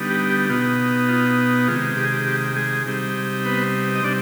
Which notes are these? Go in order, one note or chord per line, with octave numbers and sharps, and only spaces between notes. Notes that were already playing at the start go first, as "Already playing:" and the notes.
Already playing: D3 G3 B3 D#4
G4
G4
B2 B3 D#4 F4
F4
C3 D#3 G#3 F4
G4
G#4
G4
G4
G#3 G#4
C3 G3 C4 D#4
B3 B4
D#5
C3 G3 C4 D4 D5